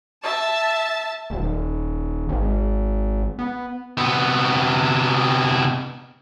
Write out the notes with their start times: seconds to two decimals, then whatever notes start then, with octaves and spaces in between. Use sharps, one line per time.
0.23 E5 A5
1.30 D#1
2.29 G#1
3.39 B3
3.97 C3 B3